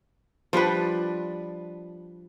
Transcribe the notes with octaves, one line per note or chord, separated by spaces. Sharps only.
F3 G3 D4 B4